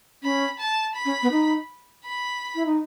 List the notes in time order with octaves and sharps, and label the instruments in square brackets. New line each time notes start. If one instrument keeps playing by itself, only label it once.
[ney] C#4 [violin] B5
[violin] A5
B5
[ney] C#4
B3
D#4
[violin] B5
[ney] E4
D#4